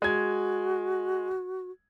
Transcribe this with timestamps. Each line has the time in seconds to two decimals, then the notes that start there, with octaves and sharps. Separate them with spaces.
0.02 G#3 F#4 G#6